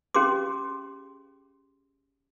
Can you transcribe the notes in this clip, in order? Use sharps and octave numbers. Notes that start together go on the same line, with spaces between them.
C#4 G4 G#4 C6 D6